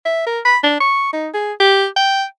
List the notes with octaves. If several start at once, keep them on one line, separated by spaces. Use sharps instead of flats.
E5
A#4
B5
D4
C#6
D#4
G#4
G4
G5